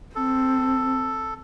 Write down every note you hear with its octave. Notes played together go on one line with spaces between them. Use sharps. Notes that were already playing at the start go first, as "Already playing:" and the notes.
C4 A4